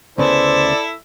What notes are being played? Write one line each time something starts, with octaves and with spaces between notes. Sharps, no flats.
D2 C#3 B3 E4 A4 C5 D5 E5